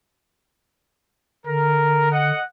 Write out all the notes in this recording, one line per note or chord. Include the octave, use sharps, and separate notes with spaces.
D3 A#4
D#5 F#5